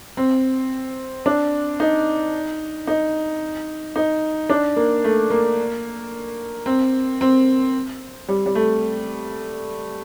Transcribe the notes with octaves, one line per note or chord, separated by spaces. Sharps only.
C4
D4
D#4
D#4
D#4
D4
A#3
A3
A#3
C4
C4
G3
G3
A3